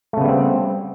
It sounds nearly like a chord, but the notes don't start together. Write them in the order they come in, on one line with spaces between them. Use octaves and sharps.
A3 C#3 B3 G3 C4